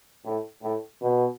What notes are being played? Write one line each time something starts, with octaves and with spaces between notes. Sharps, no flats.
A2
A2
B2